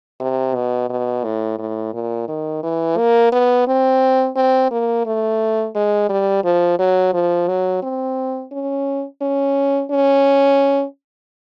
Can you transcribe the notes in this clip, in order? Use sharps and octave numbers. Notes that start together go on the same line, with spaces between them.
C3
B2
B2
A2
A2
A#2
D#3
E3
A#3
B3
C4
C4
A#3
A3
G#3
G3
F3
F#3
F3
F#3
C4
C#4
C#4
C#4